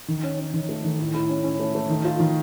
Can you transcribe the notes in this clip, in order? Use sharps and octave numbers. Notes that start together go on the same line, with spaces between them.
D#3
C#4
C#4
D#3
A3
D#3
A2
A2
C#4
C#4
A3
A3
D#3
F4
D#3